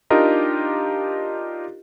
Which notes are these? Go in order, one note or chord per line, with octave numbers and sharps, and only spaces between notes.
D4 D#4 F4 G4 A#4 D#5